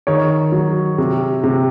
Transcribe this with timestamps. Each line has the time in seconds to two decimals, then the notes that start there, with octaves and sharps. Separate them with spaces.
0.07 D#3 C#5
0.52 F#3
0.98 C3
1.44 C3